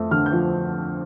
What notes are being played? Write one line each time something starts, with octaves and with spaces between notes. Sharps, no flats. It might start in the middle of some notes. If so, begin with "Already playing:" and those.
Already playing: F2 A3
D3 F6
G6
F3